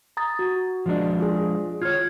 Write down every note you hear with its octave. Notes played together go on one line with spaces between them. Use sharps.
A#5 D#6 A6
F#4
F3 G#3 D4
F4 G#4
F4 C#5 F6 G#6